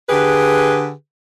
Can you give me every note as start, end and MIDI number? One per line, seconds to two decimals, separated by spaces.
0.09 0.91 50
0.09 0.91 67
0.09 0.91 68
0.09 0.91 71